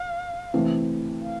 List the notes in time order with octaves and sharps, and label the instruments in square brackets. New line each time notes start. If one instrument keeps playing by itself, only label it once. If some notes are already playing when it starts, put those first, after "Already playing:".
Already playing: [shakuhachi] F5
[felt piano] E3 A3 C4
[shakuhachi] F5